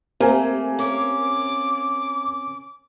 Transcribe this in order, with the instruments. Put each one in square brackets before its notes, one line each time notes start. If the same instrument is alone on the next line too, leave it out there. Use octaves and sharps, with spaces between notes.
[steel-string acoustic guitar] A3 [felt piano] A#3 G#5 [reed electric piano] C4 G4 A#4
[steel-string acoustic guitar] C#4 [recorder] D6